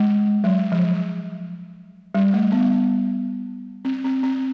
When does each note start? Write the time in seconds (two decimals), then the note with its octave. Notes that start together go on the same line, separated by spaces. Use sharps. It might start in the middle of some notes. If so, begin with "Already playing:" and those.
Already playing: G#3
0.44 F#3
0.72 F3
2.14 G3
2.34 A3
2.52 B3
3.85 C4
4.04 C4
4.23 C4